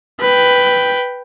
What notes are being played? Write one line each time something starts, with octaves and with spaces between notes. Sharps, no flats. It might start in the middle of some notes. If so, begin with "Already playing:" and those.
B4 G5